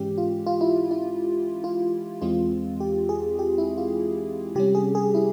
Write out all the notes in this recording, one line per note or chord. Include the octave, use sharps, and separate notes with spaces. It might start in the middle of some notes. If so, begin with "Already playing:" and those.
Already playing: G#2 E3 G#3 C#4 G4
F4
F4
E4
E4
F4
E2 E3 G#3 C4 F4
G4
G#4
G4
E4
F4
C3 G3 C#4 G4
G#4
G#4
E4